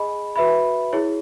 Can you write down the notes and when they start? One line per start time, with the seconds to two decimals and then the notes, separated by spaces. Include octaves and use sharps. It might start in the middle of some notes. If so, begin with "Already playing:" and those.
Already playing: G#4 D#5 G#5 B5
0.36 F#4 B4 E5 B5
0.93 E4 G#4 C#5